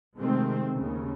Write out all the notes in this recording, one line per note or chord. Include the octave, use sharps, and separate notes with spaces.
C3 D#3 G#3 A3 C4
D#2 C#3